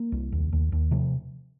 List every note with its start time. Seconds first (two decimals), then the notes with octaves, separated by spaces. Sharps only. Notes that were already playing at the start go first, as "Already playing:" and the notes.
Already playing: A#3
0.12 C2
0.32 D#2
0.52 D#2
0.72 D#2
0.91 C3 F3